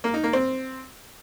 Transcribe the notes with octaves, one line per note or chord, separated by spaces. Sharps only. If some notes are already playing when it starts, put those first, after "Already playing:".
A#3
D#4
A#3
C4